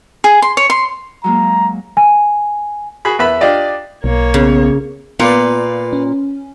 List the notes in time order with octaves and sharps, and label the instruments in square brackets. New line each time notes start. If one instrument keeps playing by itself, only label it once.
[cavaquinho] G#4
C6
C#5
C6
[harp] F#3 G#3 A#3 [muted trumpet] A#5
[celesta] G#5
[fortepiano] F#4 G#4 B5
E2 B4 E5 B5
D4 F4 G4 D5 D#5
[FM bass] B1 [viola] A#3 C#5
[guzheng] C#3 [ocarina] B3
[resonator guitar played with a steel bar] A#2 [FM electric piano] B3 F4 [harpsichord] B4 D5 F5
[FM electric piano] C#4